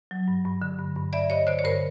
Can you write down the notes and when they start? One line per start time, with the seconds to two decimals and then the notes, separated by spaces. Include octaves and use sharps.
0.11 F#3
0.28 G2
0.45 G2
0.62 D3
0.79 G2
0.96 G2
1.13 G2 D5 E5
1.30 G2 C#5 D#5
1.47 D3 C5 D5
1.59 C#5
1.64 G2 A#4 C5